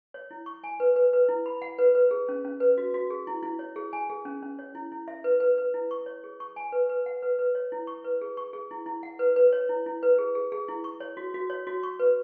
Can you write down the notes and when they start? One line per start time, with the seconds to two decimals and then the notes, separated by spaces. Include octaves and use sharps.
0.14 C#5
0.31 E4
0.46 C#6
0.64 G#5
0.80 B4
0.96 B4
1.13 B4
1.29 E4
1.46 B5
1.62 F#5
1.78 B4
1.95 B4
2.11 G#4
2.29 C#4
2.45 C#4
2.60 B4
2.78 F#4
2.94 F#4
3.10 G#4
3.27 E4
3.43 E4
3.59 C#5
3.76 G#4
3.93 G#5
4.10 G#4
4.25 C#4
4.43 C#4
4.59 C#5
4.75 E4
4.92 E4
5.08 E5
5.24 B4
5.40 B4
5.58 B4
5.74 E4
5.91 C#6
6.06 C#5
6.24 G#4
6.40 C#6
6.56 G#5
6.72 B4
6.89 B4
7.06 F#5
7.22 B4
7.39 B4
7.55 C#5
7.72 E4
7.87 C#6
8.05 B4
8.21 G#4
8.37 C#6
8.53 G#4
8.71 E4
8.86 E4
9.03 F#5
9.19 B4
9.36 B4
9.53 C#5
9.69 E4
9.86 E4
10.03 B4
10.19 G#4
10.35 G#4
10.52 G#4
10.68 E4
10.84 C#6
11.00 C#5
11.17 F#4
11.34 F#4
11.50 C#5
11.67 F#4
11.83 C#6
11.99 B4